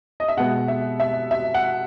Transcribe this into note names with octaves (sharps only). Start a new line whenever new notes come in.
D#5
E5
B2 G#3 B3 F#5
E5
E5
E5
F#5